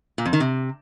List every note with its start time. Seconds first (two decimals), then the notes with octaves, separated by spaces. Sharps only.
0.18 A#2
0.26 F2
0.33 D#3
0.40 C3